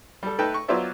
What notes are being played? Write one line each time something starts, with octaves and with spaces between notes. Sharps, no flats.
G3 A4
A3 D#4 A4 B4 G5 A5
C#6
F#3 B3 F4 C5 D5 E5